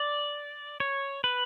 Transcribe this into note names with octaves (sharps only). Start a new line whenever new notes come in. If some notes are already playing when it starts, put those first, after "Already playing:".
Already playing: D5
C#5
B4